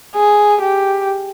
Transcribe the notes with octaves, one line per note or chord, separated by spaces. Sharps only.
G#4
G4